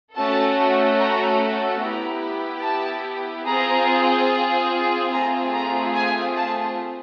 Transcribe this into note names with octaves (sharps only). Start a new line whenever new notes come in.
A3 C#4 F#4 A4 A5
A#5
B3 E4 G4 A#5
A5
C4 F4 G#4 A#5
A3 C4 F4 G#4 A#5
A#5
G#5
A5